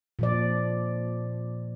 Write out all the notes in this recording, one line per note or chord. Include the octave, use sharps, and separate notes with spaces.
A#2 F3 D5